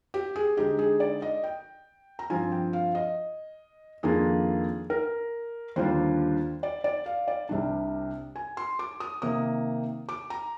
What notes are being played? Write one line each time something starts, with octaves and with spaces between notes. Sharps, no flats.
G4
G#4
D3 G#3 D#4 G4
G#4
D5
D#5
G5
A#5
G2 F3 C4 F4 G#5
G5
F5
D#5
F2 D#3 A#3 D4 F4 G#4
A#4
D#2 D3 G3 D4 F4 C5
D5
D5
F5
D5
C2 C3 G3 D4
G#5
C6
D6
D#6
C3 D#3 A#3 D#6
D6
A#5